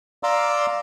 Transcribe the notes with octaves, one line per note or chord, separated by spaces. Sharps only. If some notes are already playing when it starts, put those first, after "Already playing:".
D5 F5 A#5 C6 D6 E6